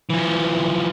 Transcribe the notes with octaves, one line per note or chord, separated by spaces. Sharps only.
E3 F3